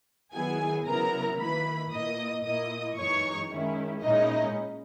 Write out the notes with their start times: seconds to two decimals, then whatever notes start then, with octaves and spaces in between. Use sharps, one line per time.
0.34 D#3 F#3 B3 E4 G#4 G#5
0.87 C#3 F#3 B3 E4 A#4 A#5
1.40 D#3 A#3 E4 B4 B5
1.92 A#2 A#3 E4 D#5 D#6
2.45 A#2 A#3 E4 D#5 D#6
2.98 F#2 E3 G#3 D#4 C#5 C#6
3.51 D#3 G#3 C#4 E4
4.03 A#2 G#3 C#4 D#4 E4 D#5